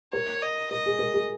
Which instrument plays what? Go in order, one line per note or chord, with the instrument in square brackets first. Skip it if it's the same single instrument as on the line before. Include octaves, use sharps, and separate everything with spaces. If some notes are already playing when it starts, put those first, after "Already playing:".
[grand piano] A#4 [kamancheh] C#5
[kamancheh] D#5
[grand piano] A#4 [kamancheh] D#5
[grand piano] G#4
A#4
G#4